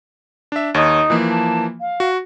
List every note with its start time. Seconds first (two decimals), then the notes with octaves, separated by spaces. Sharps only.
0.52 D4 E5
0.74 D#2 D#4 C#5
1.10 E3 F3 A#3
1.29 A5
1.80 F5
2.00 F#4